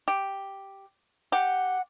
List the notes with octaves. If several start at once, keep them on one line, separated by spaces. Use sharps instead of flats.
G4
G4 F#5